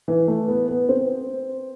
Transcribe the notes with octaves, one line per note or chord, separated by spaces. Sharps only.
E3
A3
B3
B3
C4